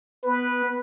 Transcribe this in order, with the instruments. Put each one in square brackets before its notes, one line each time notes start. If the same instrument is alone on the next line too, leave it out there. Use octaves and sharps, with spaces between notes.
[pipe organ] B3 [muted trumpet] B4